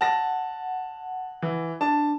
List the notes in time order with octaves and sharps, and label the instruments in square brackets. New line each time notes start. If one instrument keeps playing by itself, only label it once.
[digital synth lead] F#5 [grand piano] A5 A#6
[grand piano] E3
[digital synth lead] D4 [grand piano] A5